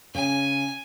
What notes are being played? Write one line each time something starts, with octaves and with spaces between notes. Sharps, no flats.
C#3 G#5